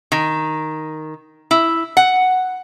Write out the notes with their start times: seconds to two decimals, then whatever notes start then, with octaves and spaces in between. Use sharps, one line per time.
0.12 D#3
1.51 E4
1.97 F#5